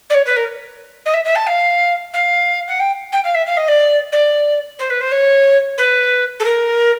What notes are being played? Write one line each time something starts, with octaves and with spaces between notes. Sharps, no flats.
D5
C#5
B4
A#4
D#5
E5
E5
A5
F5
F5
F#5
G5
G5
F5
E5
F5
D#5
D5
D5
C5
B4
C5
C#5
B4
A4
A#4